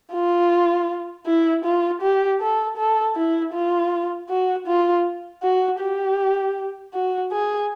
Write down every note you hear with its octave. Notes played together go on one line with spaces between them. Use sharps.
F4
E4
F4
G4
A4
A4
E4
F4
F#4
F4
F#4
G4
F#4
G#4